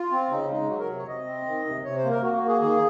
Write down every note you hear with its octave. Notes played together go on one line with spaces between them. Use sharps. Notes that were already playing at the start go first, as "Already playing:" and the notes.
Already playing: F4
C4
C#3 D#4
G#3 D#4
F#3 F#4
A#4
C3
C#5
C3 D#5
C4
D#3
C3
C3 C#5
C5
A#3
A#4
A#3 F#4
F#4
A#3
G#4
D#3 G#4